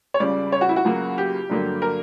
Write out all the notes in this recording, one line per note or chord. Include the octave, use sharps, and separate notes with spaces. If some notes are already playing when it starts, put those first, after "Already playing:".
C#5
C#2 C#3 G3 D5
C#5
F#4
E4
F#4
C#2 C#3 F#3 A#3
G4
G2 D3 F#3 A#3
A#4